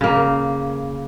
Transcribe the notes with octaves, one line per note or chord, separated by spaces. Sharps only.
C#3 A#3